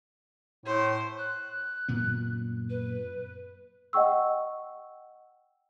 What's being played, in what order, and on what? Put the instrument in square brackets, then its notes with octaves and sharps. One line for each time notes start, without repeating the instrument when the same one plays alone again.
[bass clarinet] A2 [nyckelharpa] C5
[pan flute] F#6
[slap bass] F#2 A#2 B3
[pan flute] B4
[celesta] D#5 F#5 G5 C#6 E6